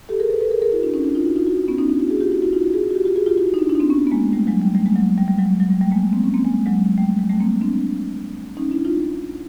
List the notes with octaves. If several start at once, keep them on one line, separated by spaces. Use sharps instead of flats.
G4 A4
G#4 A#4
A4 B4
A4 B4
G#4 A#4
G#4 A#4
E4 F#4
D4 E4
C#4 D#4
D4 E4
D#4 F4
E4 F#4
D#4 F4
E4 F#4
D#4 F4
B3 C#4
C#4 D#4
D4 E4
E4 F#4
F#4 G#4
F4 G4
E4 F#4
E4 F#4
D#4 F4
E4 F#4
F#4 G#4
F#4
F4 G4
F4 G4
F#4 G#4
F4 G4
E4 F#4
D#4
D4 E4
D4 E4
D#4
C4 D4
B3 C#4
B3
G#3 A#3
G3 A3
F#3 G#3
G3
G3 A3
G#3 A#3
F#3
G3
G3
F#3 G#3
G3
F#3
G3
G3 A3
G#3 A#3
A#3 C4
B3 C#4
A#3 C4
G#3 A#3
F#3 G#3
G3 A3
F#3 G#3
G3 A3
A#3 C4
C4 D4
C#4 D#4
D4 E4
D#4 F4